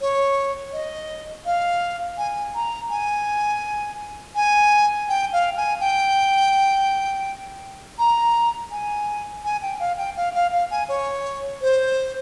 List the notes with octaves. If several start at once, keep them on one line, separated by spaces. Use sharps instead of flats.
C#5
D#5
F5
G#5
A#5
G#5
G#5
G5
F5
G#5
G5
A#5
G#5
G#5
G5
F5
G5
F5
F5
F5
G#5
C#5
C5